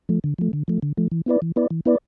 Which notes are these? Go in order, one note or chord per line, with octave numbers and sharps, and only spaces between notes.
F3 A3
D3
F3 A3
D3
F3 A3
D3
F3 A3
E3
B3 E4 B4 D5
E3
B3 E4 B4 D5
E3
B3 E4 B4 D5